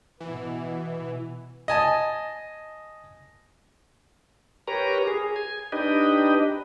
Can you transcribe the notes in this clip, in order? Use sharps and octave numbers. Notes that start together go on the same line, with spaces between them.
B2 E3 B3
D#5 G#5 A5
G4 A#4 B4 C#5 A#5
G#4
G#5
D4 D#4 G4 B4 D#5